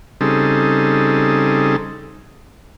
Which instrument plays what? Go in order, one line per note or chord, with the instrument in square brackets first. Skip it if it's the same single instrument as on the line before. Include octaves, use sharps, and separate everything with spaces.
[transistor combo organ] C#3 G3 C4 D#4 G#4 A4